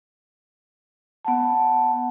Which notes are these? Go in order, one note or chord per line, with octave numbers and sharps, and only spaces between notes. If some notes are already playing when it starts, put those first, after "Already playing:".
B3 F#5 A5